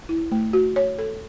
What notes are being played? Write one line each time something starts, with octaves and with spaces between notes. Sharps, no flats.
E4
A3
F#4
C#5
A4